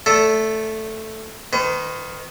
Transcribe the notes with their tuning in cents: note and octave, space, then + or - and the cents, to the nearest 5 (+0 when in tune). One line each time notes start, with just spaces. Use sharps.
A3 +0 A4 +0 D5 -30
D#3 +0 B4 +45